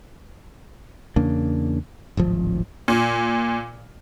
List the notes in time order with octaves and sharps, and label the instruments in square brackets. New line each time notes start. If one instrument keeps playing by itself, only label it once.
[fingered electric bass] E2 C#3 A#3 D4
D1 G#1 F3
[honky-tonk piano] A#2